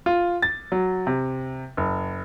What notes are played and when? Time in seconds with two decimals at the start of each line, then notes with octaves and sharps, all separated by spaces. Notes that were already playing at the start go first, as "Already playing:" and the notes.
0.06 F4
0.42 A6
0.72 F#3
1.07 C3
1.77 F#1